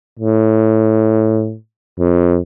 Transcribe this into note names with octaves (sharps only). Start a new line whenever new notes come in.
A2
F2